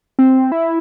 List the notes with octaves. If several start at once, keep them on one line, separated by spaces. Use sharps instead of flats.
C4
E4